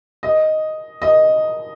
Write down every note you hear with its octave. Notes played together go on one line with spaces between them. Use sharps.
D#5
D#5